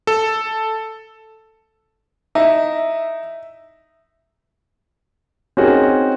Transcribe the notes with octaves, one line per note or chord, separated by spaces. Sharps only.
A4
D#4 E4 E5
C4 C#4 D#4 F#4 G#4 A#4